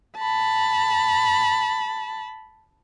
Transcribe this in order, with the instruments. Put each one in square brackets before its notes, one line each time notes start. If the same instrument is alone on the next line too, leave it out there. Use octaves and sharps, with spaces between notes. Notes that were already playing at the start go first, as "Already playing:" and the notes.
[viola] A5 B5